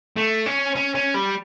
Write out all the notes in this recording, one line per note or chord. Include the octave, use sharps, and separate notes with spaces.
A3
C#4
C#4
C#4
G3